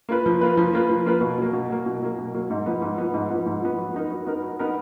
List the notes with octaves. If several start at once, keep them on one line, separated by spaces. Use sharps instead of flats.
A#3 F4 B4
F3
A#3 F4 B4
F3
A#3 F4 B4
F3
A#3 F4 B4
B2
F#3 A#3
B2
F#3 A#3
B2
F#3 A#3
B2
F#3 A#3
G#2
F3 B3
G#2
F3 B3
G#2
F3 B3
G#2
F3 B3
F#3
B3 D#4 A#4
F#3
B3 D#4 A#4
F#3
B3 D#4 A#4